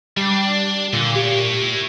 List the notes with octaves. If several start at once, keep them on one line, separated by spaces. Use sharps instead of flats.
G3 D4
A#2 D3
E4 G4 C#5